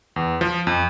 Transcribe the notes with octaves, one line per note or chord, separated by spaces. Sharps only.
E2
F3
F2